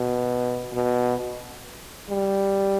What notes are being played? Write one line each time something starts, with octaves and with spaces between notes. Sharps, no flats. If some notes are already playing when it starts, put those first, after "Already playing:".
Already playing: B2
B2
G3